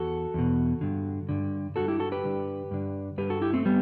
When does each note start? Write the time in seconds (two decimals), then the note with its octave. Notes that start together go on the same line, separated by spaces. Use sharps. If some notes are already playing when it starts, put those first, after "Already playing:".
Already playing: E2 F#4 A4
0.34 E2 B2
0.81 G2 D3
1.29 G2 D3
1.76 G2 D3 F#4 A4
1.88 E4 G4
2.00 F#4 A4
2.12 G4 B4
2.24 G2 D3
2.71 G2 D3
3.18 G2 D3 G4 B4
3.30 F#4 A4
3.42 E4 G4
3.54 A3 C4
3.65 G3 B3